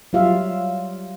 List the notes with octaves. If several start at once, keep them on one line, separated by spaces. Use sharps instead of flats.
F#3 G3 F4 E5 F5